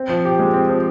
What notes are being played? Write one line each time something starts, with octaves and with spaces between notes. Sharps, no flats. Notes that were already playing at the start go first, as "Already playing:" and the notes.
Already playing: C4
F3
G4
G#3
C4
F3